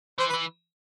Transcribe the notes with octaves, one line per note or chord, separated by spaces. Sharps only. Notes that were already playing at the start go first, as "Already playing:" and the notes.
E3 C5
B4
E3